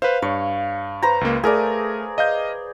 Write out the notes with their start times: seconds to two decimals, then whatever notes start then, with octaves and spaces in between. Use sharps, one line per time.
0.02 B4 C5 F5
0.22 G2 C#5
1.02 B4 C5 A#5
1.21 C#2 A#3
1.44 A3 G#4 A#4 D5
2.18 D#5 F5 G6